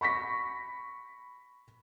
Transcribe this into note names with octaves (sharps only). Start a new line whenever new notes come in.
B5 C#6 A#6 B6